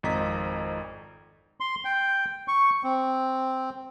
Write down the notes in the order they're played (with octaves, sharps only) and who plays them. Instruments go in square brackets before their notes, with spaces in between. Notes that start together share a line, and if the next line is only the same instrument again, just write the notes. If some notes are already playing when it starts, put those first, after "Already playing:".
[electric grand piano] G#1 F2 D#5 A#5 B6
[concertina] C6
G5
C#6
C4